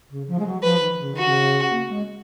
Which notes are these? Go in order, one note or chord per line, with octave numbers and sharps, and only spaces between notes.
C#3
F3
G#3
F#3
F3 B4
D#3
C#3
D#3 F#4
C#3
A#3
G#3